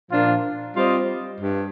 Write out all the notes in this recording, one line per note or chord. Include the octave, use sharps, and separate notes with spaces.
A#2 F3 A#3 D4 F4
G3 C4 F4 C5 D#5
G2